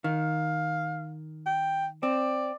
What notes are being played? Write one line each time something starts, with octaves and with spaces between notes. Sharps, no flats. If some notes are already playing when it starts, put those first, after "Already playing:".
D#3 F5
G5
C4 D5